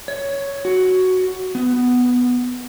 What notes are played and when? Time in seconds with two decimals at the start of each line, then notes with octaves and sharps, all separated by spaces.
0.08 C#5
0.65 F#4
1.55 B3